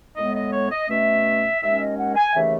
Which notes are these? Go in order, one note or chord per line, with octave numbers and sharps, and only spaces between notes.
A2 G#3 B3 D#5
D#5
C#5
D#5
B2 A3 C#4 E5
D#2 D#3 G#3 C#4 E5
D#5
F#5
G#5
D#2 C#3 E3 A3 E5